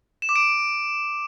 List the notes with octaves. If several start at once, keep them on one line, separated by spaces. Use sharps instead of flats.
E7
D6
D7